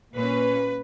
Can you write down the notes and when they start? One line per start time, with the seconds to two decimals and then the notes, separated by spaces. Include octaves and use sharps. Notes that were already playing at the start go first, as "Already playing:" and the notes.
0.13 A#2 A#3 C#4 B4